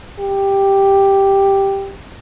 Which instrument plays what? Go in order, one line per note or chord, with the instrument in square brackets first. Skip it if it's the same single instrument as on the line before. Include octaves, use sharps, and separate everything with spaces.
[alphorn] G4